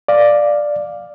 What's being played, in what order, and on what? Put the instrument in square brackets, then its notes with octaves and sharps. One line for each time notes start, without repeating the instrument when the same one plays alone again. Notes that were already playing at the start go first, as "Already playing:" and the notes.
[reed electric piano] D5 F5